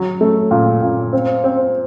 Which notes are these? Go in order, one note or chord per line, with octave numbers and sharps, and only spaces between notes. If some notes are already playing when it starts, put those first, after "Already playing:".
Already playing: F#3
A3
A#2
A#2
C4
C4